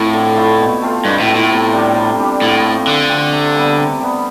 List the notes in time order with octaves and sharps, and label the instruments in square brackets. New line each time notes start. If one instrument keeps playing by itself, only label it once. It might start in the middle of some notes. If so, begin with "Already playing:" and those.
Already playing: [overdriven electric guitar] A2 [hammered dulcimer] F3 A3 C4 E4
[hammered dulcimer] D3
F3 A3 E4
B2
A3 C4 F4
[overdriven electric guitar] G2 [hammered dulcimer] B2
[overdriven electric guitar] A2
[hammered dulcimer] A3 C4 F4
[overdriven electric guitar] A2
[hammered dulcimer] C3
G3 D4 G4
C3
G3 D4 G4
[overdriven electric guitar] A2 [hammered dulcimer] F3
[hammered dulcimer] A3 C4
[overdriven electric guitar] D3 [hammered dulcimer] F3
[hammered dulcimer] A3 C4
C3
G3 B3
C3
G3 B3